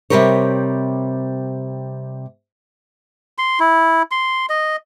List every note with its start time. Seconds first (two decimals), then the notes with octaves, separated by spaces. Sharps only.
0.10 C3 D#3 G3 G4 A#4 C#5
3.38 C6
3.60 E4
4.11 C6
4.49 D#5